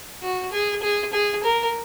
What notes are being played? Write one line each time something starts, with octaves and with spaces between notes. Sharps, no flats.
F#4
G#4
G#4
G#4
A#4